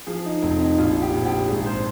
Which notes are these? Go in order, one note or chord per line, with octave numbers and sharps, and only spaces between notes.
F3 G#4
D#4
F1 C4
D#4
A#1 F4
G4
A#1
G4
G#1 G#4
C5